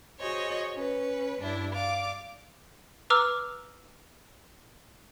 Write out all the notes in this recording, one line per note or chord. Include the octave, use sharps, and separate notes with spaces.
F#4 G#4 C5 C#5 D#5
C#4 B4
G2 D4 E4
D5 F5 D6
B4 A#5 D6 E6 F6